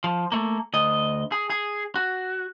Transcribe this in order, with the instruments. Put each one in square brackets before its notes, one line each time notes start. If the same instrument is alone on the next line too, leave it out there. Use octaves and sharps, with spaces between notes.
[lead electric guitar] F3
A3 A#3
D2 D#5
G#4
G#4
F#4